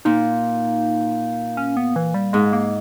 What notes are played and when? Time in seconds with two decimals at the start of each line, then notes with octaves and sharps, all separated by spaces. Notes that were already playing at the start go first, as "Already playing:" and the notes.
0.05 A#2 D#4
1.57 C#4
1.77 B3
1.96 E3
2.14 G3
2.33 G#2 G#3
2.53 A#3